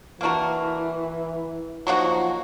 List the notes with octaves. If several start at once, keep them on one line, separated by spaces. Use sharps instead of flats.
E3 A#3 D4 F#4 A#4
F3 F#3 A#3 D#4 F#4